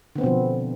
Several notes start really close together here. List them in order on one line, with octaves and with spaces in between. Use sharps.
D3 B3 C4 B2 F3